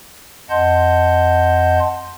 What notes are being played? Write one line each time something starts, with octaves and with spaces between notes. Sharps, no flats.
F2 D#5 F#5 A5 C6 G6